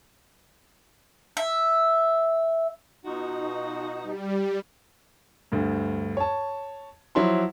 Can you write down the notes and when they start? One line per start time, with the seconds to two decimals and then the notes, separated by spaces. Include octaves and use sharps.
1.37 E5
3.05 B2 D#4 F4 F#4
4.04 G3
5.52 D2 G2
6.17 C#5 A5
7.15 F3 F#3 E4 C6